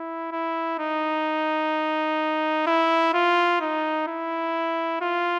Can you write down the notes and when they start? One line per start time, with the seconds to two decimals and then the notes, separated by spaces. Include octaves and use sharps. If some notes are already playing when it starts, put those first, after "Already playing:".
Already playing: E4
0.32 E4
0.79 D#4
2.67 E4
3.13 F4
3.61 D#4
4.07 E4
5.01 F4